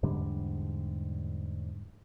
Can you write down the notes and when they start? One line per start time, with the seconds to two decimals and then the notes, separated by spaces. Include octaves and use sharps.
0.03 E2 G#2 D3 G3